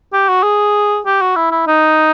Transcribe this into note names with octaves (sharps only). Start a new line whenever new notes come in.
G4
F#4
G#4
G4
F#4
E4
E4
D#4